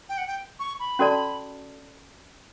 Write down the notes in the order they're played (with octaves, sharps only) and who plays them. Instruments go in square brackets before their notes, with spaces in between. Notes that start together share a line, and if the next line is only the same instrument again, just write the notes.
[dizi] G5
F#5
G5
C#6
B5
[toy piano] C#4 F#4 A4 D5 A5